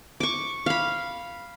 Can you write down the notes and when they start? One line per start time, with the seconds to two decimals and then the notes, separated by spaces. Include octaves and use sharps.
0.20 C#6 D6
0.66 F5 B5